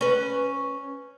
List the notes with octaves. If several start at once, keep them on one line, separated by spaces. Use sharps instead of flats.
C#4 B4